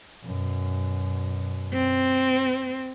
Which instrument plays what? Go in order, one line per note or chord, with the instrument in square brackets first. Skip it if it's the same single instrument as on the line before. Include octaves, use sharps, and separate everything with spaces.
[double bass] F#2 B2
[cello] C4